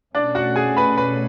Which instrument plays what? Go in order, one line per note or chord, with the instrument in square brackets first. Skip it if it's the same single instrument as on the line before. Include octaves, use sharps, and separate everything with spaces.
[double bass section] B2 A3 C#4 [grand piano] D4 D5
[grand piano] F#4 F#5
G#4 G#5
B4 B5
B4 B5